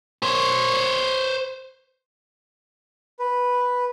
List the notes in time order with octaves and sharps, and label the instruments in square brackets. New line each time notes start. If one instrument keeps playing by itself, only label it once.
[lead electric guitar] C5 C#5
[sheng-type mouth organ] B4